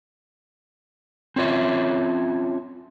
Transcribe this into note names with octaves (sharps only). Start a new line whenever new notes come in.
C4 C#4 F4 C#5 E5